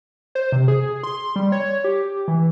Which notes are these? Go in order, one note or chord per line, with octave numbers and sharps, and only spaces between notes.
C5
C3
G#4
C6
G3
C#5
G4
E3